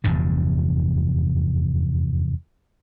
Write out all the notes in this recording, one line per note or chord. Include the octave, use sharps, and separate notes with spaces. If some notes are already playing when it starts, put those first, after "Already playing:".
F1 E2 G2 D3